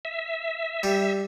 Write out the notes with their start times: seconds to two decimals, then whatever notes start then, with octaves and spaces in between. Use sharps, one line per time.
0.05 E5
0.83 G3